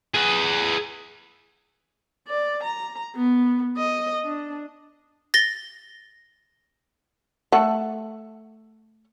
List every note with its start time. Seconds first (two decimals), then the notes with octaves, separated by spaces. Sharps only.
0.14 G#4 B4
2.28 D5
2.64 A#5
3.16 B3
3.77 D#5
4.24 D4
5.34 A6 A#6 G7
7.52 A3 A4 F#5